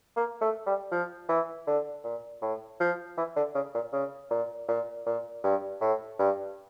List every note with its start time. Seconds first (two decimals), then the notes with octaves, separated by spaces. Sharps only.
0.16 A#3
0.41 A3
0.66 G3
0.91 F3
1.29 E3
1.67 D3
2.04 A#2
2.42 A2
2.80 F3
3.17 E3
3.36 D3
3.55 C#3
3.74 A#2
3.93 C#3
4.31 A#2
4.68 A#2
5.06 A#2
5.44 G2
5.81 A2
6.19 G2